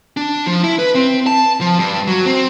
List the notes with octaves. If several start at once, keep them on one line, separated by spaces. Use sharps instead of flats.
D4
F3
E4
B4
C4
A5
F3
G2
F#3
C4